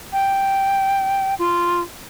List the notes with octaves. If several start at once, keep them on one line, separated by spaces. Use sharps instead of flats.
G5
F4